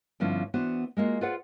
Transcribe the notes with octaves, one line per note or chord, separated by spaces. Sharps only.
G2 D3 F3 B3 C#4 E4
E3 B3 D4 F#4 C5
G#3 A#3 D4 F4 F#4
F4 G#4 B4 C5 D5 F#5